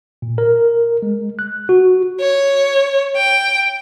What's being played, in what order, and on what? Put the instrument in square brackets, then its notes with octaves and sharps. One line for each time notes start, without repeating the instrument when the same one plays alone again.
[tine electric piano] A#2
A#4
G#3
F#6
F#4
[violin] C#5
G5